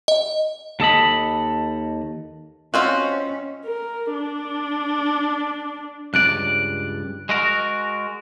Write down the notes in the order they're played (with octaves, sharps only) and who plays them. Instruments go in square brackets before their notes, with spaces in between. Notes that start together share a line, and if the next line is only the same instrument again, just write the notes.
[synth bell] D#5
[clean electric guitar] D#2 A4 D#5 B5
[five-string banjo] C4 F4 F#4 [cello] C#4 [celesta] D#5
[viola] A#4
D4
[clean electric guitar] C#2 G2 D5 [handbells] F#6
[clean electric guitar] G#3 F#4 A#4